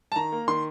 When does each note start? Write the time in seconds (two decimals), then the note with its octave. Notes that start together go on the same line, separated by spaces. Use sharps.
0.12 A5
0.16 D#3 A#5
0.32 A#3
0.48 D#3 C6